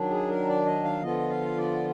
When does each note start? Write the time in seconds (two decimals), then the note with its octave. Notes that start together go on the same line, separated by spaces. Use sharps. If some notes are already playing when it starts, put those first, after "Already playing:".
Already playing: D#3 F#3 D4
0.10 G#4
0.29 A#4
0.48 D5
0.66 D#5
0.84 F5
1.01 D3 F3 B3 F4 D#5
1.30 F5
1.57 D5